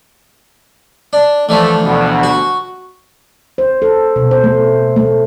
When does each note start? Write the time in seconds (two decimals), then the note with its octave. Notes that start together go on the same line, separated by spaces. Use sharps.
1.13 D4
1.49 D3 E3 F3 A3
1.84 D2 B2
2.23 F#4
3.58 C5
3.82 A4
4.16 B2
4.31 C5
4.44 A3
4.96 A3